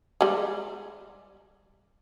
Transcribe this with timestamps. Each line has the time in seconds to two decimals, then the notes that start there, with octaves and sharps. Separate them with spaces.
0.21 G3 G#3